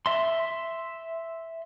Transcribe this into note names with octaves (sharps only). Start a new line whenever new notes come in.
E5 C6